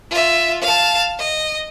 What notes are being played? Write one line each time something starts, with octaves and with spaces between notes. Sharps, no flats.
F4 E5
F5 A5
D#5